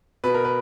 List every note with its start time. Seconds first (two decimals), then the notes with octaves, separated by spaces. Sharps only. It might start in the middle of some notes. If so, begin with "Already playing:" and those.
0.24 B2 B4
0.34 A#4
0.44 B4